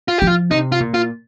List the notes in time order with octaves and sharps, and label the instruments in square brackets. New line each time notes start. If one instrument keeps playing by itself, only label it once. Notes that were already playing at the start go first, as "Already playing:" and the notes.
[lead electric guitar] F4
[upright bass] F3 [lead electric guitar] G4
[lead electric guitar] F4
[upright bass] C3 [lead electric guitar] D#4
[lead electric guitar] F4
[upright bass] A#2
[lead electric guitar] F4